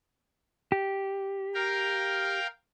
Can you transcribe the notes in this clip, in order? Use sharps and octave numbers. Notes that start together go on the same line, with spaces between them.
G4
A#4 F5 G5